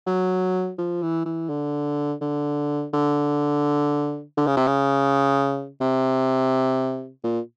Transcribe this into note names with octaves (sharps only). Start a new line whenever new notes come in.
F#3
F3
E3
E3
D3
D3
D3
D3
C#3
C3
C#3
C3
A#2